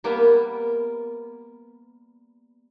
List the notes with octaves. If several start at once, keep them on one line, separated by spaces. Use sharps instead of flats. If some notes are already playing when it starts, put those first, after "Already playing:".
G3 A#3 B3